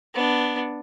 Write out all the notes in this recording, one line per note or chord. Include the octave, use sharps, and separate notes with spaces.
B3 D4